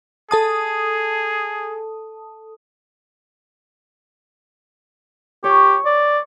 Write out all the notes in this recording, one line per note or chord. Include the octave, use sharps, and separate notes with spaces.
G#4 A4 A5 D#6
G4 C#5
D5